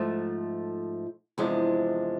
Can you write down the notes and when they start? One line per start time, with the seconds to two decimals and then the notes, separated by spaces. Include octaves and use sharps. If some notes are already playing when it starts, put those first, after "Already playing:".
Already playing: G#2 F3 A3
1.38 E2 C3 F3 G#3 D4